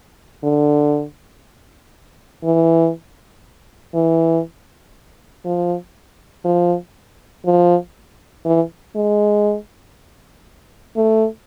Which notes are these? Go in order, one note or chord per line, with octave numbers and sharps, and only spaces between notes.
D3
E3
E3
F3
F3
F3
E3
G#3
A3